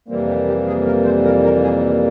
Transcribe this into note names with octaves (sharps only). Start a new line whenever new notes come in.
F2 C3 E3 G3 A#3 C4
G4
G4
G#4
A#4
C5
A#4
A#4
G#4